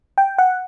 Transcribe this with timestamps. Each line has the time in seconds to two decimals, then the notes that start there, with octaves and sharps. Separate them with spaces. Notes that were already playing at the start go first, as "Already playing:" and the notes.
0.18 G5
0.38 F#5